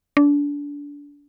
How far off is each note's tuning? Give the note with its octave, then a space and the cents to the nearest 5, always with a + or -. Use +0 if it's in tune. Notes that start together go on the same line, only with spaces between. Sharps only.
D4 -25